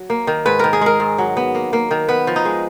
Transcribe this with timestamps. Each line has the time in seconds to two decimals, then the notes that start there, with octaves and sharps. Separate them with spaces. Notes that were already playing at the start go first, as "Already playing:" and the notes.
Already playing: F#3
0.10 A#3
0.27 D#3
0.46 G#2 B4
0.59 D#3 A#4
0.73 G#4
0.81 G#3 A#4
1.00 G#2
1.18 F#3
1.37 B3
1.55 A#3
1.73 A#3
1.91 D#3
2.09 B3 B4
2.27 F3
2.36 D#4
2.45 G#3